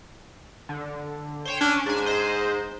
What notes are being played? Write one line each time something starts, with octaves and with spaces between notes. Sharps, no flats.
D3
C5 C#5 G5
C#4 D4
G#2 D4 G#5
G#4 C5 D#5